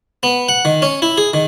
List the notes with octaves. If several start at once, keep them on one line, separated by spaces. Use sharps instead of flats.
B3
F#5
D#3
C#4
E4
G#4
D#3